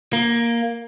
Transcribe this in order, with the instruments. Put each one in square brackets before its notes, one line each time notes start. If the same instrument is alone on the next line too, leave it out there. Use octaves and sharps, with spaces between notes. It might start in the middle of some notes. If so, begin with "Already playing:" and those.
[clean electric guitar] A#3